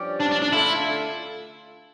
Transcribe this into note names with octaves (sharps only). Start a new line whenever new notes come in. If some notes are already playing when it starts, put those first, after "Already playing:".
Already playing: G2 F3 C#4 G4 D5
D4
D4
D4
D3 A3 D4 E4 F4 A4